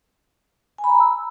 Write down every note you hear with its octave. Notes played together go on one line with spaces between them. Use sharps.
G#5
B5
A#5
B5
E6